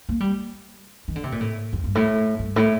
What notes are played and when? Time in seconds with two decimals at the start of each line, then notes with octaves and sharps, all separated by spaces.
0.09 A#3
0.20 G3
1.08 D#3
1.16 D3
1.24 C3
1.32 A#2
1.40 A2
1.73 F2
1.84 G2
1.95 A2
2.39 G2
2.56 A2